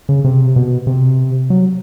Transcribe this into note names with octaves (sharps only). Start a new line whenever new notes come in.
C#3
C3
B2
C3
F#3